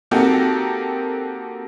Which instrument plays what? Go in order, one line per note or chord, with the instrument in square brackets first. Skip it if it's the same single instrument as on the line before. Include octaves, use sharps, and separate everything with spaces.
[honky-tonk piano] A#3 C4 D#4 F#4 G4 A4